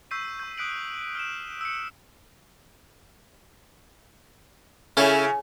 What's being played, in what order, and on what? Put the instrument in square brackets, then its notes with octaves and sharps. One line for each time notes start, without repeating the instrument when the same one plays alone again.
[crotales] C#6 E6 G6 B6 C7 D#7
C#6 G6
D#6 F#6 B6 D7 F#7
F6 D7 E7
E6 C#7
[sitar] C#3 [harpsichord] C#4 E4 A4